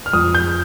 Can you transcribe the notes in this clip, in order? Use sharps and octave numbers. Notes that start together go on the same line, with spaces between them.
F6
F2 D#6
G6